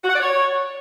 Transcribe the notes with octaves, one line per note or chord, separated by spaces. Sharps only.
F#4
F#5
D5
C#5